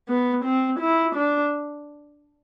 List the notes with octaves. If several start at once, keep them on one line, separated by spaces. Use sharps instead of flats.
B3
C4
E4
D4